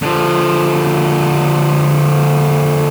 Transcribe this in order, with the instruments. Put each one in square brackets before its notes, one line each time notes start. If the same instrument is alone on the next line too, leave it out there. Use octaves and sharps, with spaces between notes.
[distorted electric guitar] D3 F3